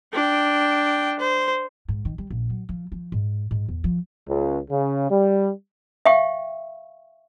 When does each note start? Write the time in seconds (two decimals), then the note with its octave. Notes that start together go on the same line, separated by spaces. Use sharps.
0.14 D4 G5
1.19 C5
1.88 G#2
2.05 D#3
2.18 G3
2.30 A#1
2.50 F#3
2.69 F3
2.92 F3
3.12 G#2
3.51 G#2
3.68 E2
3.84 F3
4.28 C#2
4.70 C#3
5.10 G3
6.06 E5 F5 G5 C#6